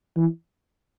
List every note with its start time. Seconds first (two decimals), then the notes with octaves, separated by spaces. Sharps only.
0.16 E3